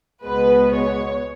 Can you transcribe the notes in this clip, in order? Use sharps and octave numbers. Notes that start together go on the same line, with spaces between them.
C#2 B2 G#3 B3 B4
C#5